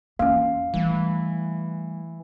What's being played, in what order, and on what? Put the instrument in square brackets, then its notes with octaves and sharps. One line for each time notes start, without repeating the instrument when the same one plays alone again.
[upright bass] E2 [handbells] A#3 C#4 [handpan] F5
[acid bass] E3 [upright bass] G3 A3